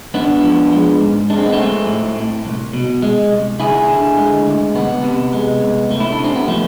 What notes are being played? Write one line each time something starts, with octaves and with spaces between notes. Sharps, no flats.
G#2 B3 D4
F3
G#3
G#2
G#3 D4
C4
B3
A3 C4
G#3
A2
A2
C2
B2
G#3
C2
D2 E4 G#4
D3
G#3
D2
C2 B3
C3
G#3
C2
A3
E4
D4
C3
C4
B3
F3 A3